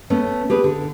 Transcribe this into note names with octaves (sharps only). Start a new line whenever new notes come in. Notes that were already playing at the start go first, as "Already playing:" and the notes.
A3 B3 C#4
G4 G#4 B4
D3